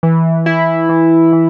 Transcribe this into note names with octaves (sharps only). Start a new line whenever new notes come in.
E3
E4
E3
E3